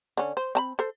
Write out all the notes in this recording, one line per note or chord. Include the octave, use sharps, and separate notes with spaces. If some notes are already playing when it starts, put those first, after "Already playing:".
D3 C#4
C5
C4 A5 B5
A4 C5